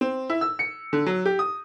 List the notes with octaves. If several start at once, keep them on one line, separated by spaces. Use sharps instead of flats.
C4
E4
E6
C#7
D3
F#3
G4
D#6